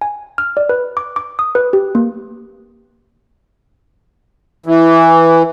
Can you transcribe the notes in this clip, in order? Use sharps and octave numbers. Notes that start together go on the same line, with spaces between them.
G#5
F6
D5
B4
D6
D6
D#6
B4
G4
A#3
E3